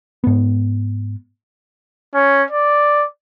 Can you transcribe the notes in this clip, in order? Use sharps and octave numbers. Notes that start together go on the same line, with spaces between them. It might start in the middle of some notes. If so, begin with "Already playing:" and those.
G#2 B3
C#4
D5